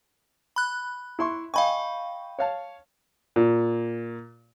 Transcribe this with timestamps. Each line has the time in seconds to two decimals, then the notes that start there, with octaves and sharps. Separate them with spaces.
0.56 B5 F#6
1.19 E4 C6 C#6
1.54 D#5 F5 G5 G#5 B5 C#6
2.39 C#5 F5 A5
3.36 A#2